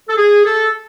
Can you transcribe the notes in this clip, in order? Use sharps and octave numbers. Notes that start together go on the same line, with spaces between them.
A4
G#4
A4